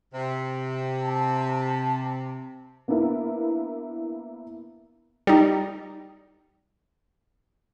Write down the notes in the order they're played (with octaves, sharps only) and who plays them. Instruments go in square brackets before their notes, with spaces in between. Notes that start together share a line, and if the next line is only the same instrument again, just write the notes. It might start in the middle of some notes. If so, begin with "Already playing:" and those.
[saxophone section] C3
[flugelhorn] A5
[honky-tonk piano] A#3 B3 D4 E4 A#4
[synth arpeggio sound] G3 D#4